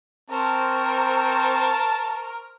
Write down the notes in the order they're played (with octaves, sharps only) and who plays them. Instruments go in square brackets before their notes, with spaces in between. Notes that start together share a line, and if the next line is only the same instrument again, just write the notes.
[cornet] C4 [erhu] A#4 [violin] C5 C#6 [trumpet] A5